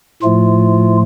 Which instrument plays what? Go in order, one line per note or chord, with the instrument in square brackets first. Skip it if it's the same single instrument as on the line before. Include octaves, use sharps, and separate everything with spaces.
[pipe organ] A2 F3 A3 F4